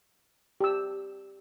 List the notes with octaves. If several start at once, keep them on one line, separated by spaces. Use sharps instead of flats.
G4 E6